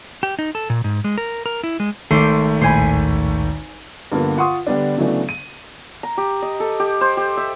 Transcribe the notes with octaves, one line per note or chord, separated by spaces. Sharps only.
G4
D#4
A4
A#2
G#2
G#3
A#4
A#4
E4
G#3
G#1 A3 C5 C6 D6
A#1 D#2 A2 C5 G#5 B5
G2 D3 F3 A#3 B3
F4 F#5 C6 C#6 D#6
D3 G3 B3 D4
C#3 E3 F#3 A3 B3 D4
D#7
A#5
G4
D#5
A4
G4
C5
G4
E5